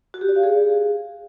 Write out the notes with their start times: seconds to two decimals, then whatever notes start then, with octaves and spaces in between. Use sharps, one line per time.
0.14 F#4
0.21 G4
0.29 D5
0.36 F5
0.43 G#4